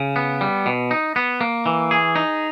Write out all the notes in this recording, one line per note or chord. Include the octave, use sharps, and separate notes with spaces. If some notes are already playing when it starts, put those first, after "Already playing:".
Already playing: C#3
B3
G3
B2
D#4
B3
A#3
E3
G#4
D#4